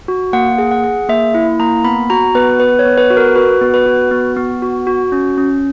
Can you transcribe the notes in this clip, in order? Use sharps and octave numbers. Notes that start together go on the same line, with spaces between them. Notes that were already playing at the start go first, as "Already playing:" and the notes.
F#4
A#3 F#5
G#4
F#5
G#4
A#3 E5
E4
A#3 A#5
B3 B5
F#4 A#5
B3 B4
B3 B4
C#5
B3
B4
F#4
A#4
F#4 B4
B3
B4
F#4
B3
B3
F#4
F#4
C#4
C#4